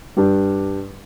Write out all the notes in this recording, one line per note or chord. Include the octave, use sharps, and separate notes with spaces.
G2 G3 D4 G4